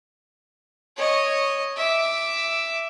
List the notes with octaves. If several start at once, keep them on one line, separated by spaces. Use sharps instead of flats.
C#5 D#5
E5 D6